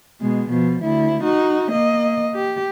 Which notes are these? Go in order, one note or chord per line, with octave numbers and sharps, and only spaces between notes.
B2 G#3
B2 F3
D2 E4
D#4 F#4
A#3 D#5
G4